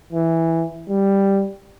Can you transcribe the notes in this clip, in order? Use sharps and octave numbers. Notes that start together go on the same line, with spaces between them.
E3
G3